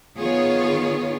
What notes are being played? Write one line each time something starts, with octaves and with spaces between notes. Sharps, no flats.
D#3 B3 F4 G#4 C#5